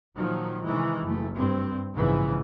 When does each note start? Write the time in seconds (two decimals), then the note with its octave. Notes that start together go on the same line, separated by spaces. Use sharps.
0.16 A#2 D#3 F3 F#3
0.65 C3 D#3 E3 G#3
1.02 F#1 A3
1.36 G2 C4
1.94 A#1 G#2 C#3 E3